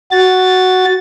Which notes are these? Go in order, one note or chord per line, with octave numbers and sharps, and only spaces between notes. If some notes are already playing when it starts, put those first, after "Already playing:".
F#4 A6